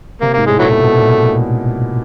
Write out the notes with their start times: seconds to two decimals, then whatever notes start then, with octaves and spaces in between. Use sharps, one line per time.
0.21 C3 A#3
0.33 G#2 A#3
0.46 A2 G#3
0.59 A#2 E3 F#3 A3
0.71 B2
0.83 B2
0.96 A#2